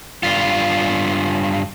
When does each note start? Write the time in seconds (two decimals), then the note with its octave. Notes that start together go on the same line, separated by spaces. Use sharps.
0.23 G2 F4